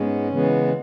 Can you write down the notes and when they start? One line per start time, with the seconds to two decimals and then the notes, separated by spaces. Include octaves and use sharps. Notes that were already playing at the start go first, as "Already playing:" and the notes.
Already playing: G#2 G#3 B3 C#4
0.30 C#3 E3 G#3 B3